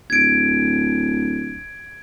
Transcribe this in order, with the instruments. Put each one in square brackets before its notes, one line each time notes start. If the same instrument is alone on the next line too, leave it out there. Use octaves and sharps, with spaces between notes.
[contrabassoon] D1 [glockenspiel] G#6 D7